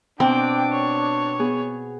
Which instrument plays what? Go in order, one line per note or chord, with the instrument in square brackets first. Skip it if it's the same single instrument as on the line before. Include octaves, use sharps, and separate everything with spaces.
[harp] B2 [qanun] C4 [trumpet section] D4 [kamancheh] G5 D6
[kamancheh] C#5
[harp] B3 G#4